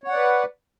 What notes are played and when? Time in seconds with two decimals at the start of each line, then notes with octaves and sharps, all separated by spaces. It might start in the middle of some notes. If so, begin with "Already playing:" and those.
0.04 C#5
0.08 F#5
0.12 D5
0.16 B4